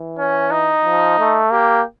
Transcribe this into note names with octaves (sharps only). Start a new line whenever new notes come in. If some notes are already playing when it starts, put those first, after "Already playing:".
Already playing: E3
C#4
D#4
F3
A3
A#3 G4